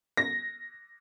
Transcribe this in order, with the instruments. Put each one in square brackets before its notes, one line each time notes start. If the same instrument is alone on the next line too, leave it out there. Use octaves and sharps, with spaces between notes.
[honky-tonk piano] A#6